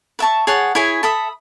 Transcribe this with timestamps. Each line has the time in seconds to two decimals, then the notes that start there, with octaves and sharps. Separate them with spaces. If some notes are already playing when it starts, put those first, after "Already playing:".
0.19 B4 E5 A5 C#6
0.47 G#4 C#5 F#5 A5
0.75 E4 G#4 C#5 G#5
1.03 A4 E5 B5 D#6